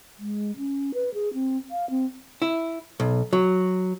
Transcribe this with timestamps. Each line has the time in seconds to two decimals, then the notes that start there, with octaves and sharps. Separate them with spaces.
0.19 G#3
0.57 C#4
0.94 B4
1.14 G#4
1.34 C4
1.71 F5
1.90 C4
2.42 E4
3.00 B1
3.33 F#3